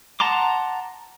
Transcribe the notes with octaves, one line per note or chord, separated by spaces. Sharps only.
F#5 A5 A#5 C6 D6